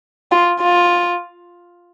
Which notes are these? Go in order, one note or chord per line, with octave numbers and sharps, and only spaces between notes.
F4
F4